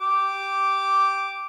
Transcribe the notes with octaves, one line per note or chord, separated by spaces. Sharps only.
G4 D6